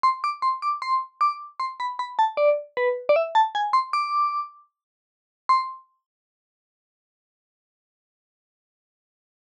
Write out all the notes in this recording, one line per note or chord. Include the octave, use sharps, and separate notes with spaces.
C6
D6
C6
D6
C6
D6
C6
B5
B5
A5
D5
B4
D5
E5
A5
G#5
C6
D6
C6